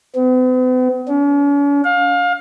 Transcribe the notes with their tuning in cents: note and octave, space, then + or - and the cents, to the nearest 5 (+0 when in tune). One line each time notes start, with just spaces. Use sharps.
B3 +45
C#4 +45
F5 +25